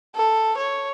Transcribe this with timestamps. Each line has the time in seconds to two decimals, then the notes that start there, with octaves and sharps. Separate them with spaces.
0.15 A4
0.57 C#5